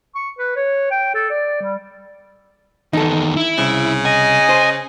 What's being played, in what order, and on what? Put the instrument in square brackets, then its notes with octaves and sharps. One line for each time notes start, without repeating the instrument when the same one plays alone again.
[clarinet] C#6
B4
C#5
G5
A4
D5
G3
[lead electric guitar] E2 D#3 [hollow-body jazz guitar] D#4 A4
[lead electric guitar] E4
[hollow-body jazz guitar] C2 [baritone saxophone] C#3
[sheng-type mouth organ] D#5 [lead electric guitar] G#5
[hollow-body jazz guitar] C5